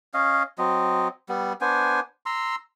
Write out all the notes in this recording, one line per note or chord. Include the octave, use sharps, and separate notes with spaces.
C#4 D#5 F5
F#3 C4 D#5
G3 B3
B3 D4 C5 G#5
A#5 C6 E6